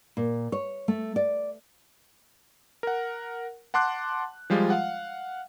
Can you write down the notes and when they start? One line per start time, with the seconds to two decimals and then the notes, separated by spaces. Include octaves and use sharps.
0.17 A#2
0.52 C#5
0.88 A3
1.16 D5
2.83 A#4 F#5
3.74 F#5 A5 C6 D6 F#6
4.50 F3 G3 G#3 F4
4.70 F5 F#5